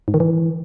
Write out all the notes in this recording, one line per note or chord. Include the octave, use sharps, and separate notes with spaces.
G#2
D#3
E3